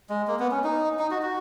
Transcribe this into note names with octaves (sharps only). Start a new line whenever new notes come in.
G#3
A#3
B3
C#4
D#4
D#4
F#4
F#4